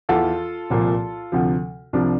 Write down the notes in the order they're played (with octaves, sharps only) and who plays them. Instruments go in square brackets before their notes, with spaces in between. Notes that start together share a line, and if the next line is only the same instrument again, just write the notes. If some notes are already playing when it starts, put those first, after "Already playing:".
[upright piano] E2 E3 F4 A4
C2 A#2 F3
D2 C3 F3
C2 C3 F3 D4